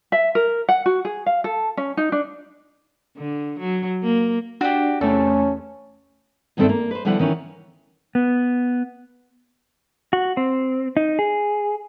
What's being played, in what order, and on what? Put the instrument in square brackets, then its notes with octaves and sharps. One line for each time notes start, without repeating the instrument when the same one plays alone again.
[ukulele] E5
A#4
F#5
F#4
G#4
F5
A4
C#4
D#4
D4
[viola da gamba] D3
F#3
A#3
[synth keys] D4 D5 [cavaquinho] F#4 G4
[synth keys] E2 C3 A3 [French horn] C#4 [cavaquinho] A4
[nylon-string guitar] E2 G2 D#3 C4 A4 E5
A#3
B4 C5
D3 F3 G3 B3 E4 F#5
D#3 E3 C#4
[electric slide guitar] B3
F#4
C4
D#4
G#4